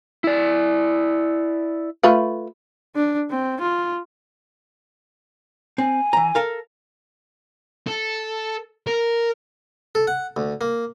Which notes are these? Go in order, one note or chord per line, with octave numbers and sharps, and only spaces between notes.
E4 D5
A3 F4 B4
D4
C4
F4
C4 G#5
E3 A#5
A4 A#4 F5
A4
A#4
A4
F#5
D2
A#3